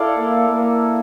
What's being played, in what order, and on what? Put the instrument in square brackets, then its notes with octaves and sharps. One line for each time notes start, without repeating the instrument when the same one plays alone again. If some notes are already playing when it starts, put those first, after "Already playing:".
Already playing: [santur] E4 A4 D5 F5
[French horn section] A#3
A#3